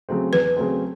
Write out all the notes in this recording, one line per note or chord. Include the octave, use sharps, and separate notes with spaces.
C#3 F#3 A3 C4
E2 B4
C#3 F#3 A3 C4